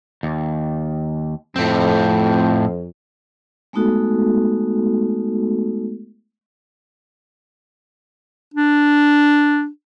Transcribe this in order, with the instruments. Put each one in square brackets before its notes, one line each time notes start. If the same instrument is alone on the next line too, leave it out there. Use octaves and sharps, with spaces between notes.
[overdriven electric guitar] D#2
[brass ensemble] F2 [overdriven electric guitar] A2 C4
[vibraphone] G#3 A3 B3 D#4 F#4 A4
[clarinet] D4